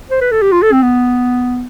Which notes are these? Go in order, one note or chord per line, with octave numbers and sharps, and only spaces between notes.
C5
B4
A4
G4
F4
A4
C4
B3